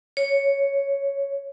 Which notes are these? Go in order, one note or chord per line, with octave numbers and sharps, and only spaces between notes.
C#5